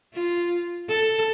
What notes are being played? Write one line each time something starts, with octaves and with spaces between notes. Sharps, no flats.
F4
A4